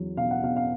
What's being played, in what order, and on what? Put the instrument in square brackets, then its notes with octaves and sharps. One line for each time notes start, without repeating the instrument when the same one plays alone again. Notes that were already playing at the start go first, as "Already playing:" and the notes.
Already playing: [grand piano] E2 F#3
B2 F5
F#5
B2 F5
F5